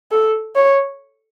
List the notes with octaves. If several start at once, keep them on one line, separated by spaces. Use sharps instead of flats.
A4
C#5